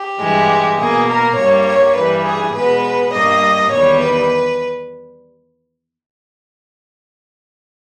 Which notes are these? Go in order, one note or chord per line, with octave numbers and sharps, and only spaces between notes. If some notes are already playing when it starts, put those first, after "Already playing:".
Already playing: G4
G2 E3 G#3
B2 A#3 G#4
A#4
G2 G3 A#3 C#5
C#5
G2 E3 G3 B4
G#4
B2 G#3 B3 B4
B4
G2 G3 A#3 D#5
E2 D#3 G3 C#5
B4